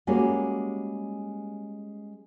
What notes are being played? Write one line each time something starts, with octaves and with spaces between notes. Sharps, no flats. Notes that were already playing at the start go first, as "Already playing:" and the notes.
G3 G#3 A#3 C#4 F#4